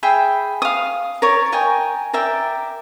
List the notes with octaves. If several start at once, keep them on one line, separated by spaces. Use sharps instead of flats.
G#4 E5 G5 B5
F5 D#6
A#4 C#5 D5
A#4 D#5 G5 G#5
A#4 D5 E5 G5